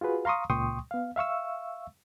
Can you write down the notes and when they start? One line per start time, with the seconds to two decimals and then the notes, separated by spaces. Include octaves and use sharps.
0.01 F4 F#4 G#4 B4
0.25 F5 A#5 C6 C#6 D#6
0.50 C#2 A#2 G5 C6 C#6 D#6
0.91 B3 F5
1.16 E5 F5 C#6 E6